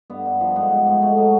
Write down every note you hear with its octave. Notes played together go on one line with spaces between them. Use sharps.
G2 B3
G2
F3
G#2 B3
G#2
G#2
B2 A3
F#3